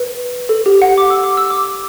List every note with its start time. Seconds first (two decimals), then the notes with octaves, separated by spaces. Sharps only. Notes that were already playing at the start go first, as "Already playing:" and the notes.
Already playing: B4
0.49 A4
0.66 G4
0.82 F#5
0.98 D6
1.10 E6
1.24 D6
1.37 E6
1.50 D6